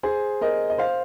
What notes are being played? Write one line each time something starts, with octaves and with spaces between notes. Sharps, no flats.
G#4 C5
A#4 D#5
D#5
C5 F5